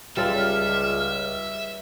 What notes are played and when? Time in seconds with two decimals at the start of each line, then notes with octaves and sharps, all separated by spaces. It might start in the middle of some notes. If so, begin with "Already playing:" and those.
0.17 C#2 G3 F4 A4 E5 F6